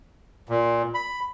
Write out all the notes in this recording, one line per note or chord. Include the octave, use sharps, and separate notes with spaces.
A#2
B5